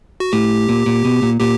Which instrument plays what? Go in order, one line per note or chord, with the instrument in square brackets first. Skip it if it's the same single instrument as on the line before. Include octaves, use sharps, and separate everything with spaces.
[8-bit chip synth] F#4
[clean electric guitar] A2 [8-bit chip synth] G4
[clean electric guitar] A#2
A#2
B2
A#2
[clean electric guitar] A#2 [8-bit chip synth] G4